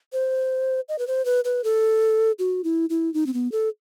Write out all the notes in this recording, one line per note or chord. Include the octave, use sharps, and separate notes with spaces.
C5
D#5
B4
C5
B4
B4
A4
F#4
E4
E4
D#4
C4
B3
A4